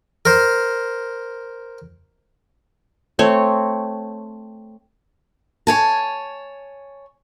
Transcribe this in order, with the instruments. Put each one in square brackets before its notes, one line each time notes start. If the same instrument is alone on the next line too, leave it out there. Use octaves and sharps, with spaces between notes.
[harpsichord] A#4 C5
[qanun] A3 C4 C#5
[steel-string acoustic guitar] C#5 G#5 A5